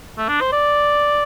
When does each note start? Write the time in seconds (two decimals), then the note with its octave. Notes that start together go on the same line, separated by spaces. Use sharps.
0.17 A3
0.28 D4
0.41 C5
0.52 D5